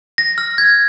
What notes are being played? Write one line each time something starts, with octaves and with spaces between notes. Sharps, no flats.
A#6
F6
G#6